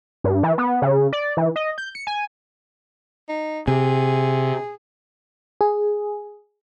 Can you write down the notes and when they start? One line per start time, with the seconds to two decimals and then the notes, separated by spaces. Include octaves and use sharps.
0.24 G2
0.43 E3
0.58 B3
0.82 C#3
1.13 D5
1.37 E3
1.56 D#5
1.78 G6
1.95 C#7
2.07 G#5
3.29 D#4
3.68 C3 G#4
5.61 G#4